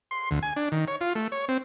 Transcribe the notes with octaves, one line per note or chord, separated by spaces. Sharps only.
C6
D2
G#5
D4
D#3
C#5
F4
A3
C#5
C4